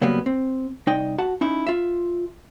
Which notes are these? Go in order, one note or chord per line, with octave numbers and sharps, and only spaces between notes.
C#3 F#3 G3 A#3 B3
C4
C2 D#4 D5 D#5 G5
F#4 F#5 A5
C#4 D#4 E4
F4 E5